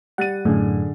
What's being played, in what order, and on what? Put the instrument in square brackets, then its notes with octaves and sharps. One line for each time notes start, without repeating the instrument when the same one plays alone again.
[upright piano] G3 A6 D#7 [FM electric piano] F#5
[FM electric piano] F#2 A2 [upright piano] D3 G#4